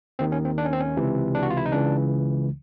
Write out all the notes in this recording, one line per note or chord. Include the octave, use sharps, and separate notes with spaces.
D#2 D#3 C4
C#4
C4
D4
C#4
C4
C#4
C#2 C3 E3
D4
F#4
F4
E4
D#4
C#2 C#3 E3 D4